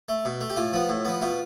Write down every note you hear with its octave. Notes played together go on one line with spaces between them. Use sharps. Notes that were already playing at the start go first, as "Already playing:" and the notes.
A3
B2
A3
G4
A2 F4
F3 B3
A2
F3 B3
B2 F4